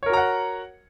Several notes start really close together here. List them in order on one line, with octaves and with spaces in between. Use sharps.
C#5 A#4 F#4 A#5 F#5